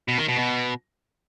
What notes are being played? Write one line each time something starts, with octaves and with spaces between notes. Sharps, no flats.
B2
D#3
B2
B2